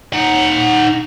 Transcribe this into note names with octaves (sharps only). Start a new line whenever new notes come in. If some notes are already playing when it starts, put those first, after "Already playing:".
D#4 F#5